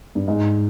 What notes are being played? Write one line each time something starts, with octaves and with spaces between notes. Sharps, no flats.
G2
G#2